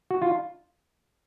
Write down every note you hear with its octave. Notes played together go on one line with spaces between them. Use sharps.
F#4
F4